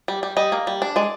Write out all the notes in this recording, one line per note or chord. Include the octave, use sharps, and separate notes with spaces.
G3
G3
G3 D#5
A#3
G3
D4
G#3 D5